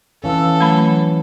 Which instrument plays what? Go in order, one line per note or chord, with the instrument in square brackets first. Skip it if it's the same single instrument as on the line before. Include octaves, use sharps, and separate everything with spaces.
[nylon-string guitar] E3 C#4 [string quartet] A4 [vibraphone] F5 E6
[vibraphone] F#3 C#5 [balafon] A3 B5